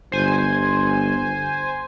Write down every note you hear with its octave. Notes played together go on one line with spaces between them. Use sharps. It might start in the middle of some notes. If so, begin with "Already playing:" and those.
G1 C5 G#5